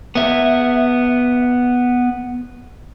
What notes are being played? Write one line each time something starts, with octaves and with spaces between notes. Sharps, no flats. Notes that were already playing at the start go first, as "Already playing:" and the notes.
B3 E5